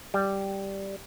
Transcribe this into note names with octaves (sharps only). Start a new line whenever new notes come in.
G3